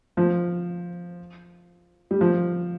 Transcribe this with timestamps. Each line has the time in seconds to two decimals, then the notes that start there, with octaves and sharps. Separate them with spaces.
0.17 F3
2.11 G3
2.21 F3